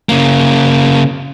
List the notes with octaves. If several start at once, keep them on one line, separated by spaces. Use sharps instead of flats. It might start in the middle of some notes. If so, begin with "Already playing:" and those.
C#3 A#3